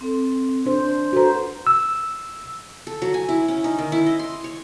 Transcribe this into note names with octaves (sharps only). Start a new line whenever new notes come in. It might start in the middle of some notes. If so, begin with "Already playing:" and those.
C4 A4
D4 C5 C6
F#4 A4 B4 C5 A#5
E6
A4
F#3
G#5
E4
C#4
D#4
D#3
E4
D#5
C6
C#5